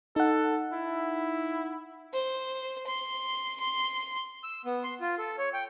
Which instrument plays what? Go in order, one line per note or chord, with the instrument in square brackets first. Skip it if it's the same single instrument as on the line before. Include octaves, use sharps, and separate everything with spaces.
[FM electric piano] D#4 F#5 [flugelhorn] A4
[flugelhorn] E4
[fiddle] C5
C6
C6
[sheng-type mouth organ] E6
B3
C6
F4
A4
C#5
G5